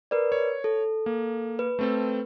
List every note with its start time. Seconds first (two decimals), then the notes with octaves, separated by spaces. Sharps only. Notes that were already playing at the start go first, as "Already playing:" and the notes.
0.11 A#4 B4 D5
0.32 C#5
0.64 A4
1.06 A#3
1.59 B4
1.79 A3 C4 A4